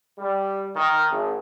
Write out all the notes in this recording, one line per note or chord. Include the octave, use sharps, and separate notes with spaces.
G3
D#3
G#1